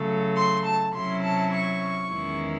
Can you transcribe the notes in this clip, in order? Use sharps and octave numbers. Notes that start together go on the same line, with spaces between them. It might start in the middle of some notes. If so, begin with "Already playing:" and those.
Already playing: C#3 F#3 A3
C6
A5
C3 F#3 C#4 E4 C6
A5
C#6
E2 D#3 G#3 C#4 E4